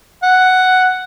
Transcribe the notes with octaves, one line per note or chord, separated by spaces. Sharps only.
F#5